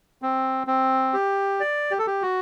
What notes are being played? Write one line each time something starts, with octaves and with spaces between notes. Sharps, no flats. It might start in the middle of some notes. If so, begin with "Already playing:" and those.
C4
C4
G4
D5
G4
A4
G4
F#4